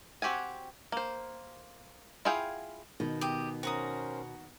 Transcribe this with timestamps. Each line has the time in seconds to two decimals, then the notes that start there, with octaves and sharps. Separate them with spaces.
0.22 C4 F#4 G4 F#5 G#5
0.92 A#3 C5
2.25 E4 F4 G#4 F5 G5
3.00 B2 D#3
3.21 G4 D#5
3.63 C#4 F#4 A#4 C5 A#5 D#6